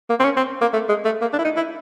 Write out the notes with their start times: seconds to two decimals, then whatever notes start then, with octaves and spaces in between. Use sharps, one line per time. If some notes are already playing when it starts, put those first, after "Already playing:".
0.10 A#3
0.20 C4
0.24 C#4
0.37 C4
0.61 A#3
0.73 A3
0.89 G#3
1.05 A3
1.21 A#3
1.33 D4
1.39 E4
1.44 D#4
1.56 E4